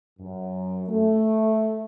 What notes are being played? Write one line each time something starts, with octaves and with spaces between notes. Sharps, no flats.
F#2
A3